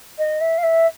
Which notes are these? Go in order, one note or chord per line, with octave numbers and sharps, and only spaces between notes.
D#5
E5
F5
E5